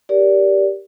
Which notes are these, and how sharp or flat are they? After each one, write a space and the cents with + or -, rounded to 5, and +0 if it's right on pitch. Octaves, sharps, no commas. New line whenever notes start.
G4 +0 A#4 +15 D5 -20